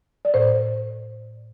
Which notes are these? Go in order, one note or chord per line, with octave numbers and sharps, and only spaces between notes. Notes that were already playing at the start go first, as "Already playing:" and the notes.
D5
A2 C5